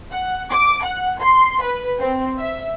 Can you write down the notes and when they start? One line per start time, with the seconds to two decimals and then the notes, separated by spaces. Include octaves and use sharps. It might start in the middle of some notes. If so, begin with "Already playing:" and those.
0.11 F#5
0.51 D6
0.84 F#5
1.19 C6
1.61 B4
1.99 C4
2.38 E5